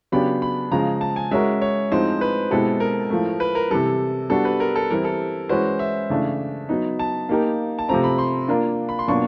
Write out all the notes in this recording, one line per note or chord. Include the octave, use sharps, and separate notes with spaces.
C#3 F#3 B3 D4 G4 B5
B5
C#3 F3 G#3 A#5
A5
G#5
G#3 C#4 F#4 A#4 E5
C#5
A2 F3 G#3 C4 D#4 C5
B4
B2 G#3 C4 E4 G4 A4
A#4
A2 F3 A3
B4
A#4
C3 E3 G3 A4
G3 B3 D4 F#4 A4
B4
A#4
A4
E3 G3 C4 E4 A#4
A4
E3 G#3 C#4 F#4 B4 C5
E5
C#3 E3 A3 D4
F#3 B3 D#4
A5
A#3 D#4 G4 A#4
A5
C3 F3 A3 C4 A#5
B5
C6
A#3 D4 F4 A#4
B5
C6
B2 F#3 A#3 D4 F4 C#6